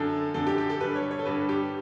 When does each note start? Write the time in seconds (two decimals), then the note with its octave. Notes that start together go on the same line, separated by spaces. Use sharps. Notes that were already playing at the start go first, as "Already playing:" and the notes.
Already playing: F#2 D3 A4
0.34 F#2 D3 A4
0.47 G4
0.58 G4
0.70 A4
0.80 G2 D3 B4
0.95 C#5
1.11 C#5
1.19 A4
1.25 G2 D3 B4
1.49 G4